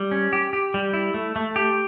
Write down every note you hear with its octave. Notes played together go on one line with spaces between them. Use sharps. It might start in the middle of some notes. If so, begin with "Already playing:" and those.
Already playing: G3
C#4
G4
G4
G3
E4
A3
A3
G4